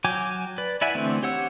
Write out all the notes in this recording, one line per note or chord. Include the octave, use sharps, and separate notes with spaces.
F#3 G5 G#5 D6
B4 D5
E4 D5 E5 F#5 G#5
D3 E3 A3 C4
G4 C#5 F#5 E6